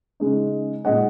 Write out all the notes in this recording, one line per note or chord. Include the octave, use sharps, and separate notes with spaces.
C#3 G#3 D#4
A#2 G#3 D#4 D#5 F#5